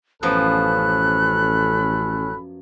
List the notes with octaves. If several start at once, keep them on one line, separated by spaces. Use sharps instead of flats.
A1 F#2 F3 B3 C#4 A4 B5 F#6